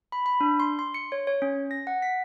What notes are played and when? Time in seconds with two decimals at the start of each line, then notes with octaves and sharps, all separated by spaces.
0.12 B5
0.26 B5
0.41 D4
0.60 C6
0.79 C6
0.94 C#7
1.12 C#5
1.27 C#5
1.42 C#4
1.71 A#6
1.87 F#5
2.02 B6